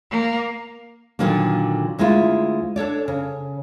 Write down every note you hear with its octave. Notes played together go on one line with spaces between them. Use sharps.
A#3
A#2 D3 D#3 F#3 A#3
D2 G#3 A#3 E4 F4
D4 A4 C#5 D5
C#3